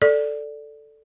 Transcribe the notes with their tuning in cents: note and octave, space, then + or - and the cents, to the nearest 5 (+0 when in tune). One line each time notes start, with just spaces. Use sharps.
A4 +0 D5 +0